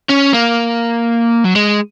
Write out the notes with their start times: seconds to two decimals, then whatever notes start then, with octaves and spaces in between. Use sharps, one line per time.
0.10 C#4
0.34 A#3
1.45 F#3
1.56 G#3